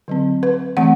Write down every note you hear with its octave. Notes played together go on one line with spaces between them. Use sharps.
D3 F#3 C4
B4
E3 A3 C4 F#5